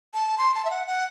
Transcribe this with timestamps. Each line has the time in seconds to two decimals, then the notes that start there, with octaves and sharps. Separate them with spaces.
0.14 A5
0.38 C6
0.55 A5
0.65 E5
0.71 F#5
0.87 F#5